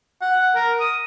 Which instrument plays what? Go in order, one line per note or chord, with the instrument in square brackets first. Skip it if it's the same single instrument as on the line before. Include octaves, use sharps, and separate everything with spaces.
[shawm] F#5
A#4
D#6